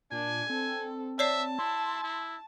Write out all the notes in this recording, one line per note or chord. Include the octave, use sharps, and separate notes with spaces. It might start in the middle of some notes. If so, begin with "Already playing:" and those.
A#2 D4 G#5
C4 A4
C#5 D5 E5 A5 C7
E4 C6
E4